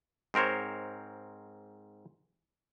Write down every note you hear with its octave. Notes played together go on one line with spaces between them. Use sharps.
G#2 C4 A#4 C5 C#5